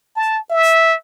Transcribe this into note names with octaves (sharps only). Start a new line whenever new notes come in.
A5
E5